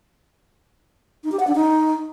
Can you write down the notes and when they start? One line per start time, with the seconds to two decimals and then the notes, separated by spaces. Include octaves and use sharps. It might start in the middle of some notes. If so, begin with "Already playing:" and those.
1.24 D#4
1.32 G4
1.39 F#5
1.47 D4
1.55 D#4